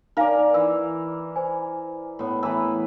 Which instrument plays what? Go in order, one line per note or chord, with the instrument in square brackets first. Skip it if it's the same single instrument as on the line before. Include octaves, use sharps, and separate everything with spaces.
[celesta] D#4 F5 G#5 [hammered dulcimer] A#4 D5
[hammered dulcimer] E3 [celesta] E6
[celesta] C5 G#5
[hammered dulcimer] A2 B3
[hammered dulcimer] E3 B4 [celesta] E5 A#5 E6